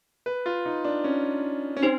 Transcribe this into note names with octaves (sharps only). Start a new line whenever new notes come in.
B4
F4
D#4
D4
C#4
C#4
C4 D#4 G4 C5